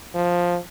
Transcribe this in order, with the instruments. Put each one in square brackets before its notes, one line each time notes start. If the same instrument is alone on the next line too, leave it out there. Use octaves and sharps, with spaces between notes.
[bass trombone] F3